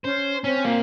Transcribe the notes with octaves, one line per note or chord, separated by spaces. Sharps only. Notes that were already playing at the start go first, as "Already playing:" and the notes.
C#4 C5
C4 C#4
A#2 A#3